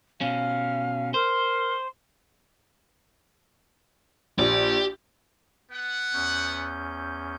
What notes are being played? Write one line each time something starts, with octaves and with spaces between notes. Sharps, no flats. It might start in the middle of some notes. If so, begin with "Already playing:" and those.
B2 C#4 F5
A#4 C5 C6
A#1 G4
B3 F#5
E2 C#4 G6